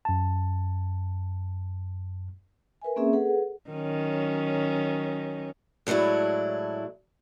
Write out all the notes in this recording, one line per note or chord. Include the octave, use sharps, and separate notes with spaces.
F#2 A5
A#4 B4 E5 G#5
A#3 C4 C#4 G#4 E5
G#4 A4 B4 F#5
D#3 F#3 C#4
A2 F#3 G#3 D4 E4